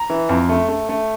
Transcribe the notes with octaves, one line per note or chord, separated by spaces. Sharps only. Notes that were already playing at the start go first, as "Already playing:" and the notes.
Already playing: A#5
E3
F2
A3
A3
A3